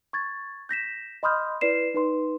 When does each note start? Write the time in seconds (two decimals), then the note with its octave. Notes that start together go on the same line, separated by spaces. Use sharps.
0.13 C#6 G#6 A6
0.69 G6 A#6 B6 E7
1.23 D#5 B5 C6 D#6 F6 G6
1.61 E4 B4 D5 C7 E7
1.94 D#4 B4 C6